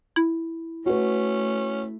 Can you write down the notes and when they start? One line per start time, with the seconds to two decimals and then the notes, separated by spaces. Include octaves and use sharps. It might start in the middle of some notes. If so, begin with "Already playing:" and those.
0.16 E4
0.86 A3 C#4 F#4 B4